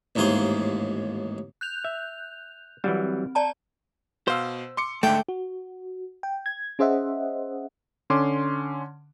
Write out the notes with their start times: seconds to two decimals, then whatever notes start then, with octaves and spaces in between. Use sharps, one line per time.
0.15 A1 D#2 G#2 G#4 F5 C6
1.61 F#6 G6 F7
1.84 E5
2.84 E3 F#3 G3 C4
3.35 D5 A5 A#5
4.28 B2 C5 F5 E6
4.77 C6 D6 C#7
5.03 G#2 D3 A3 G5
5.28 F#4
6.23 G5
6.46 G#6
6.79 C#4 G#4 C5 D#5 E5 F#5
8.10 D3 C#4 C6 D6